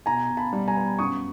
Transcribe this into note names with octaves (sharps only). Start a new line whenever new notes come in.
B2 G#5 A#5
B2
A5 B5
G3
G#5 A#5
B3
F#2 C#6 D#6